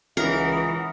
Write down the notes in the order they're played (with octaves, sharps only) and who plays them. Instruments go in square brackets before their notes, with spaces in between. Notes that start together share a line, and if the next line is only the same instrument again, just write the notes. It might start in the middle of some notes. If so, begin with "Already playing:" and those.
[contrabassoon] C#2 [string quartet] E3 [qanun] A#4 [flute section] E5 F#5 D#6